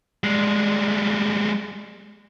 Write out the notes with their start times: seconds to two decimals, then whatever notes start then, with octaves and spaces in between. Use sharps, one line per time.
0.24 G3 G#3